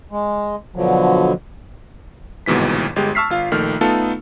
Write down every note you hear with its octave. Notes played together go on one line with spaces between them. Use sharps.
G#3
B2 D3 F3 F#3
G1 D#2 G#2 B2 E3 B6
G1 G#3 G4
A5 C#6 E6 F6 B6 C7
G1 F4 F5
A#1 D#3 A3 F6
A3 B3 D#4 F4 A4